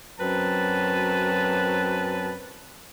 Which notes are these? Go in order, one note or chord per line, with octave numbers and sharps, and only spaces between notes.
F#2 F#3 C4 B4 A5